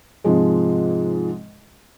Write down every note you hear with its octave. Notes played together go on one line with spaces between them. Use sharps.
G#2 C3 F3 G#3